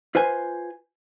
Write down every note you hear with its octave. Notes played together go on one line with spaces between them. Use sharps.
F4 B4 C5 G#5